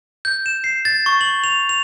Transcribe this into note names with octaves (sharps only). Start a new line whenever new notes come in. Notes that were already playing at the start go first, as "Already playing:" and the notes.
G6
E7
C7
A6
C#6
F#7
F7
F7